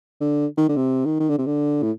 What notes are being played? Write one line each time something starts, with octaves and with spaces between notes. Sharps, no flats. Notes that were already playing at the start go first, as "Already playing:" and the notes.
D3
D#3
D3
C3
D#3
D#3
D3
C3
D3
A2